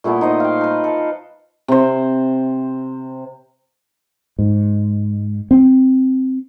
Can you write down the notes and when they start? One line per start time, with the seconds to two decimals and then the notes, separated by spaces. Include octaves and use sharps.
0.04 A#2 A3 B3 E4
0.21 D#4 C5 D#5
0.40 F5 G5
0.61 A#4 B4
0.84 A4 F5
1.68 C3 C5
4.39 G#2
5.51 C4